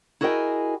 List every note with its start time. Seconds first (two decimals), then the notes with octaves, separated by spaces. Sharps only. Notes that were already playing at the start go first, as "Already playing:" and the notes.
0.21 E4 F#4 G#4 A#4 D#5 G5